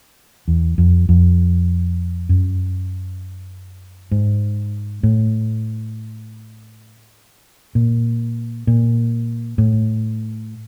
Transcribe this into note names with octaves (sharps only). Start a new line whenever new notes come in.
E2
F2
F2
F#2
G#2
A2
A#2
A#2
A2